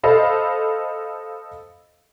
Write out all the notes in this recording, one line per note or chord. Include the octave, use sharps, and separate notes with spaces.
A4 C5 D#5 F5 B5